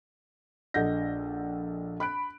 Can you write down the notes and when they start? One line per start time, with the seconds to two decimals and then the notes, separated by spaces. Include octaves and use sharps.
0.74 A#1 A4 D#5 F#5 G6 A#6
2.00 B5 F#6 D7